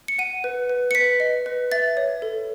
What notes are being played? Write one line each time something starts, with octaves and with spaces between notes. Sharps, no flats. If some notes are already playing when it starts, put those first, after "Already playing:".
C#7
F#5 D#7
B4
B4
C#7
B4 B6
D#5
B4
E5 A6
C#5
A4